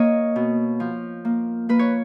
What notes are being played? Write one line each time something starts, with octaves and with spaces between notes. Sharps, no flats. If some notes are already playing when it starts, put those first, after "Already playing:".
Already playing: A#3 C#5 D#5
B2
F3
A#3
A#3 B4
C#5